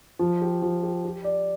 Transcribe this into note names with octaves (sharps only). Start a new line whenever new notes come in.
F3
G4
F3
G4
G4
D5